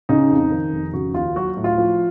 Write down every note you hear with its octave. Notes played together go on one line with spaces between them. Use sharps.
C#3 D#4
F2
D#3
F1
C#3 F#4
D#2 F4
F#3 F#4
A2
F4
F3